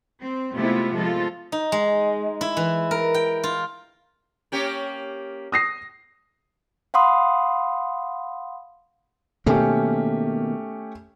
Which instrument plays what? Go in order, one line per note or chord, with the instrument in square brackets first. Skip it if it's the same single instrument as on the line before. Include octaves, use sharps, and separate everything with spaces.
[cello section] C4
C3 G#3 A3 B3 E4 F4
F3 G#3 F4 A4
[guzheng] D#4
G#3
E4
E3
A#4
G5
F4
[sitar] A#3 C#4 G4
[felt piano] D#6 A#6 C7
[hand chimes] F5 F#5 B5 C6 D#6
[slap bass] B2 D#3 A#3 [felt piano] A3 C#4 G4